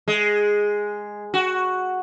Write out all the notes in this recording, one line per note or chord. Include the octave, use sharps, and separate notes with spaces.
G#3
F#4